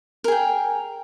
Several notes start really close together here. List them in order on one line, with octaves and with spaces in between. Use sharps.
A#4 G#4 G5